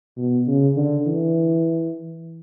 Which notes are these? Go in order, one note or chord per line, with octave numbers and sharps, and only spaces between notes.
B2
C#3
D3
E3